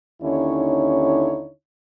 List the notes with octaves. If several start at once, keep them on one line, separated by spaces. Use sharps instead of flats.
D#2 D3 C#4 D#4 E4 C#5